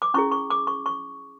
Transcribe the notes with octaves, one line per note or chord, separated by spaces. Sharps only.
D6
C#4 E4 G#4 C#6
C#6
D6
C#6
C#6